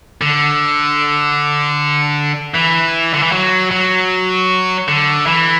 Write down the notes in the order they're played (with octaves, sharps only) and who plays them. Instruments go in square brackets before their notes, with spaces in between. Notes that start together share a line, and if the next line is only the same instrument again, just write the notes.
[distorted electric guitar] D3
E3
D3
E3
F#3
F#3
D3
E3